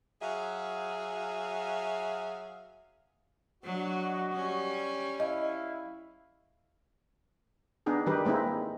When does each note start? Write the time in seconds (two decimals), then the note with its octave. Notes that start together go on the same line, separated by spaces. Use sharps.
0.22 F#3 G#4 E5 F5
3.64 F#3 D4 F#4 D#5
4.33 G3 C#4
5.20 E4 D#5 F5
7.86 B3 D4 D#4 G#4
8.06 D#3 G3 G4 A#4 B4
8.25 G#3 A#3 C4 D#4 E4